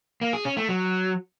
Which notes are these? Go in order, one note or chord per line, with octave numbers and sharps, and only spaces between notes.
A#3
G#4
C#4
A3
F#3